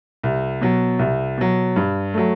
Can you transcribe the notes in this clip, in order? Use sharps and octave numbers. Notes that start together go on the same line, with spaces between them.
C2
B2 F#3
C2
B2 F#3
G2
F#3 A3